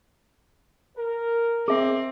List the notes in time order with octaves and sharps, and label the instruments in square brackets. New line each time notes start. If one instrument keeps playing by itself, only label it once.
[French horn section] A#4
[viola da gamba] C4 [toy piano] G#4 E5